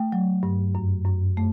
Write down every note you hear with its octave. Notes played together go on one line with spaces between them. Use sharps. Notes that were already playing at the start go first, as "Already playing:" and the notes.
Already playing: A3 G5
F#3
G2
F#2
F#2
A3